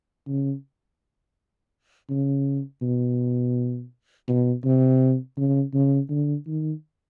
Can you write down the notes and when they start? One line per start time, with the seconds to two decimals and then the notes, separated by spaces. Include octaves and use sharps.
0.28 C#3
2.10 C#3
2.82 B2
4.28 B2
4.64 C3
5.37 C#3
5.74 C#3
6.10 D3
6.47 D#3